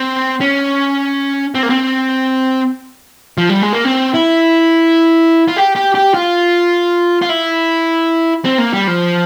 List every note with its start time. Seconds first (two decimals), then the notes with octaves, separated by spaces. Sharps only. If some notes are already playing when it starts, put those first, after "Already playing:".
Already playing: C4
0.41 C#4
1.55 C4
1.63 A#3
1.70 C4
3.38 F3
3.49 G3
3.62 G#3
3.73 A#3
3.85 C4
4.14 E4
5.48 F4
5.57 G4
5.76 G4
5.95 G4
6.14 F4
7.21 F4
7.29 E4
8.44 C4
8.58 A#3
8.73 G3
8.87 F3